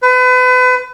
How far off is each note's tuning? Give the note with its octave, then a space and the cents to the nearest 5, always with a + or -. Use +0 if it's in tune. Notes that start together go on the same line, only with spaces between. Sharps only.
B4 +35